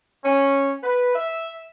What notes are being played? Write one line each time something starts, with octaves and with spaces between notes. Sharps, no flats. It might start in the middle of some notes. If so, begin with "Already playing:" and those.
C#4
B4
E5